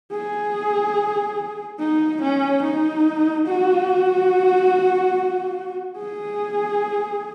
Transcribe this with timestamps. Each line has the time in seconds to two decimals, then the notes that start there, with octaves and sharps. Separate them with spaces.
0.12 G#4
1.79 D#4
2.22 C#4
2.63 D#4
3.47 F#4
5.98 G#4